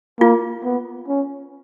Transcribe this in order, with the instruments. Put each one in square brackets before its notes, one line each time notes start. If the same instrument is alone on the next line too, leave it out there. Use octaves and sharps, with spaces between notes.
[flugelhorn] A#3 [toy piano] F4
[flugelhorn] B3
C#4